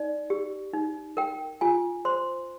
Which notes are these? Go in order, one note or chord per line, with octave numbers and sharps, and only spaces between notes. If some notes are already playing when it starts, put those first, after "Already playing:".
Already playing: D#4 D5
G4
D#4
A#4 G5
F4 G#5
C5 C6